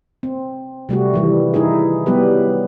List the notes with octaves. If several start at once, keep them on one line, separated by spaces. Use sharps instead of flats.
C4
C3 G3 A3 F#4
D#3 E3 G3
E3 D#4 E4 G#4
F#3 G3 B3 G4 B4